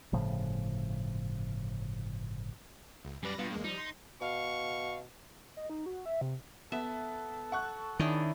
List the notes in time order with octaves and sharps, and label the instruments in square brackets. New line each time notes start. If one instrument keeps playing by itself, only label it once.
[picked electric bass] G1 A2 C#3 F3
[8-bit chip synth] C#2
[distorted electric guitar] F#2 D5 [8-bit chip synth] G3 B4 A#6
[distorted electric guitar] G2 [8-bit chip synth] B2 B3 F4
[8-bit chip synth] E2 G#3 A#3
[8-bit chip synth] F3 G3 [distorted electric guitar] D#4
[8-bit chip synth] C6
[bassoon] B2 [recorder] F5 [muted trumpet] C#6
[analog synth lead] D#5
D#4
F#4
E5
C3
[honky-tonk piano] B3 [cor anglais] A4 [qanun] E5
[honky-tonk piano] F#5 C#6 F#6
[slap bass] D#3 [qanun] C#4 D4 E4 [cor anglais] G#4